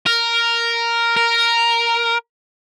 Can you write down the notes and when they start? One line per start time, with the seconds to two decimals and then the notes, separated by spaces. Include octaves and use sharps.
0.06 A#4
1.17 A#4